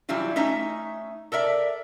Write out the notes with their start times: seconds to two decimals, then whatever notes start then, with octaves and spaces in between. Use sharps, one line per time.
0.09 E3 F#3 G3 E4 F4
0.36 A3 C#4 D#4 E5
1.32 A4 A#4 D5 E5